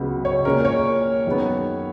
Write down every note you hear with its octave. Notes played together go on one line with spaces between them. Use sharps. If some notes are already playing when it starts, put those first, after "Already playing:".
Already playing: C#2 C#3 F#3 B3
C#5
A#2 G#3 C#4 A#4
C#5
F#2 D#3 G#3 B3